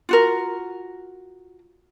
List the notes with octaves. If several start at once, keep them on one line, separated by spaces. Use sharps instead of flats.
F4 F#4 A#4